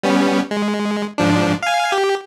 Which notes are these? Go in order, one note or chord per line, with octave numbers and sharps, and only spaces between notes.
G3 B3 C#4
G#3
G#2 F3 D4
F5 G#5
G4